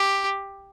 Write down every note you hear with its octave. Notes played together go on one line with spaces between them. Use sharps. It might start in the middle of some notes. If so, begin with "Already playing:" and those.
Already playing: G4